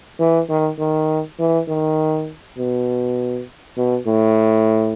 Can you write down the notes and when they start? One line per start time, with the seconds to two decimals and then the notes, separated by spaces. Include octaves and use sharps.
0.19 E3
0.49 D#3
0.79 D#3
1.39 E3
1.68 D#3
2.58 B2
3.77 B2
4.07 A2